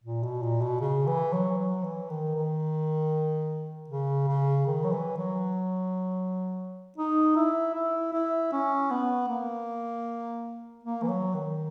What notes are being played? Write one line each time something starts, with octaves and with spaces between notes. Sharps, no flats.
A#2
B2
A#2
B2
C#3
E3
F#3
F#3
E3
D#3
D#3
C#3
C#3
D#3
F#3
E3
F#3
D#4
E4
E4
E4
C#4
B3
A#3
A#3
E3
F#3
D#3